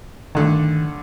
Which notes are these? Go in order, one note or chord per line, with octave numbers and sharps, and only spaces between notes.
G2 D3 D#3 A3